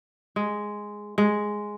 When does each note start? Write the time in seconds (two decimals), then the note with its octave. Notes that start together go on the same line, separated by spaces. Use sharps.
0.36 G#3
1.18 G#3